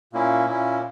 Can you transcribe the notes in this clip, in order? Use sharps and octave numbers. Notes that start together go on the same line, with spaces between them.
A#2 A#3 C#4 E4
A#2 A#3 C#4 E4